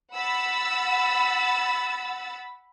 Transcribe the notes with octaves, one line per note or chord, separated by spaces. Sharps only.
F#5 B5 E6 A6